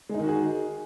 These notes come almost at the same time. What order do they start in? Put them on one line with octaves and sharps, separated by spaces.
G#3 D#4 D#3 F#4 G#4